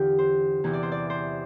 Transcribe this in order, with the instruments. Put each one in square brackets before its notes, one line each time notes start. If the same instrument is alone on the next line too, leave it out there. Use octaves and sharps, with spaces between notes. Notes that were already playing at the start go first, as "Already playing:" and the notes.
Already playing: [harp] E2 D3 F4 G4
C5
E2 C3 E3
D5
C5
D5
C5